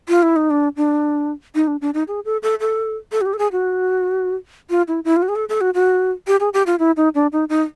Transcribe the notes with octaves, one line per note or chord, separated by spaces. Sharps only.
F4
E4
D#4
D4
D4
D#4
D4
D4
D#4
G#4
A4
A4
A4
A4
F#4
G4
A4
G#4
F#4
F4
E4
E4
F4
F#4
G#4
A4
A4
F#4
F#4
G4
G#4
G4
F4
E4
D#4
D4
D#4
D#4